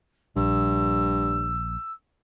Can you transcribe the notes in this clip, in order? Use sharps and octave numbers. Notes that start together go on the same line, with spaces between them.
A#1 G2 E6